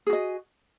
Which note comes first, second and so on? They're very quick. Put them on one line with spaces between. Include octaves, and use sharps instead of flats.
G#4 F#4 D#5